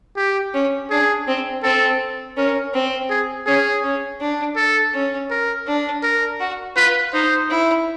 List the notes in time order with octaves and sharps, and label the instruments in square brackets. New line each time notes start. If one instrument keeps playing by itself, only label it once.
[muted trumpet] G4
[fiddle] C#4
[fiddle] D4 [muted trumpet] G#4
[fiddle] C4
[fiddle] C4 [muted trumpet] A4
[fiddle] C#4 [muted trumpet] A#4
[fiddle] C4
[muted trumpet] G#4
[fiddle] C#4 [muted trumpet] G#4
[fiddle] C#4
D4
[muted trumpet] A4
[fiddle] C#4
[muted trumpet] A#4
[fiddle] D4
[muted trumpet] A#4
[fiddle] F#4
[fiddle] F4 [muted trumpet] B4
[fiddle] D#4 [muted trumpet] C5
[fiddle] E4